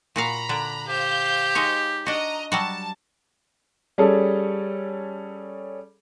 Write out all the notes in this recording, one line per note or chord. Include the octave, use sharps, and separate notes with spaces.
A#2 F#4 F5 A#5 B5
D3 D4
G4 C5 F5 G6
G#3 D#4 C#5
D4 F#4 D#5 A#5
F#3 G3 F#4 A5
G3 C#4 G#4 A4